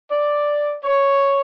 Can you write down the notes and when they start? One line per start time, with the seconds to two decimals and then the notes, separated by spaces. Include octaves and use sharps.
0.10 D5
0.83 C#5